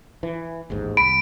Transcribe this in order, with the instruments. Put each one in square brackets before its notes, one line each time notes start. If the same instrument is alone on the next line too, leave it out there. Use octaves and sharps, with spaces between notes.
[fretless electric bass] E3
A1 D#2 G#2
[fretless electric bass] C2 [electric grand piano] B5 [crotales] D7